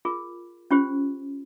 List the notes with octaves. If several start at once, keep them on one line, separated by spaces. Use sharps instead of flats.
F4 G#4 A#4
C#4 F4 G4 C5